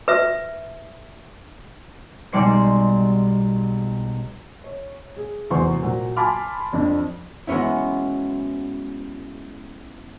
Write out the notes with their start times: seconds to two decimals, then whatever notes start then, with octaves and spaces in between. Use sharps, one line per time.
0.08 B4 E5
2.33 B1 G3 G#3 D5 C6 C#7
4.64 C#5
5.16 G#4
5.50 F1 E2 F#3 C5 C6 C#6
5.83 A#2 F#3
6.16 G#5 A5 B5 C6 D6 F6
6.73 F2 D4
7.47 F#3 G#3 B3 C#4 E4